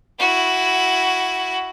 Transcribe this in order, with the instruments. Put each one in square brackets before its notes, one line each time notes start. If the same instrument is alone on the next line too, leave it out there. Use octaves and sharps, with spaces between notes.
[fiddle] E4 F#4